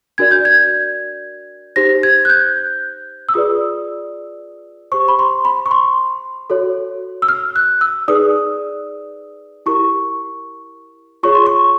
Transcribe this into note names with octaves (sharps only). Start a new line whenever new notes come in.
D4 F#4 A#4 D5 G#6
G6
G#6
D#4 G4 C5 A#6
G#6
F#6
G6
E6
F4 G#4 B4 D5 D#6
G4 C5 C#6
B5
C6
B5
C#6
C6
F#4 A4 C#5
E6
F6
F#6
E6
D#4 G#4 B4 D5 D#6
E4 G4 A#4 C#6
F4 G#4 C#5 C#6
C6
C#6